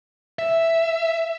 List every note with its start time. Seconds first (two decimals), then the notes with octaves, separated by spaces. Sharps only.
0.39 E5